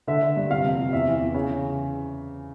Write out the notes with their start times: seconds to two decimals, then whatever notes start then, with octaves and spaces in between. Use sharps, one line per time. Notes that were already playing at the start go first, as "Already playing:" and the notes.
0.07 D3 E5
0.22 D3
0.37 G2
0.50 C3 F5
0.64 F2
0.78 C3
0.93 E2 E5
1.07 E3
1.21 E2
1.34 C#3